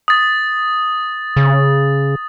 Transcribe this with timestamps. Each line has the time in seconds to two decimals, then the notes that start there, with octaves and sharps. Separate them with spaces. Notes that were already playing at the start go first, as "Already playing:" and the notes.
0.08 D#6 A6
1.37 C#3